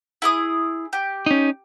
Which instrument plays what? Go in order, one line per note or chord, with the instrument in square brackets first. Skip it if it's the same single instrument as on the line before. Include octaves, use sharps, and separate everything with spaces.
[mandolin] E4 G#4 D#6
G4
[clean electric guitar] C#4 D#4